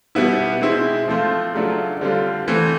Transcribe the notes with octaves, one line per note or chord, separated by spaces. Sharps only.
B2 G3 B3 E4
B2 G#3 C4 E4
F3 A3 C4 F4
C#3 F#3 A3 D4 F4
D3 G3 C4 F4
E3 A3 C4